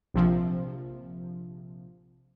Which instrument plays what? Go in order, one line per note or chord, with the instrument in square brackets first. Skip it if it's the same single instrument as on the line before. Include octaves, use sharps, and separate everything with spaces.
[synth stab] A#1 C3 F3